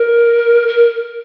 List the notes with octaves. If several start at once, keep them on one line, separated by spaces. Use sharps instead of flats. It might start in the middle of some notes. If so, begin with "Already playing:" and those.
Already playing: A#4
A#4